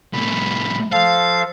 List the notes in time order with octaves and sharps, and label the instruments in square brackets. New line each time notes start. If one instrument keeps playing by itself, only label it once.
[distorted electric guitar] C2 A2 [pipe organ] B5
[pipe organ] F3 A4 [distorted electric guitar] F5